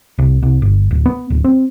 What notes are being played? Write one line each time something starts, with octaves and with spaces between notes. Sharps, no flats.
C2
C2
G1
D1
B3
D1
C4